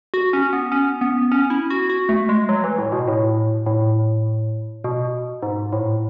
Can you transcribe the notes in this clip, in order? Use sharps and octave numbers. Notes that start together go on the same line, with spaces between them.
F#4
C#4
B3
C#4
B3
C#4
E4
F#4
F#4
A3
G#3
F#3
E3
A2
B2
A2
A2
B2
G#2
A2